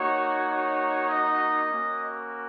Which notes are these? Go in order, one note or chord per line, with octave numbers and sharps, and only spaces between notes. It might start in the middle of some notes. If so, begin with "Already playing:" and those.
Already playing: A#3 D#4 F#4 C#5
C#5
D#5
A#3 C#4 F#4